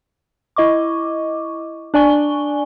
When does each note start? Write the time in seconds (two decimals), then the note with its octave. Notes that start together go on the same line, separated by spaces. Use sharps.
0.56 E4 D#5 C#6 D6
1.94 D4 D5 G#5 C#6 G7